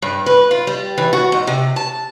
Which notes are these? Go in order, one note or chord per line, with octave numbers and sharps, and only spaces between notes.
G2
B4
F4
G3
E3
F#4
G#2
C3
A5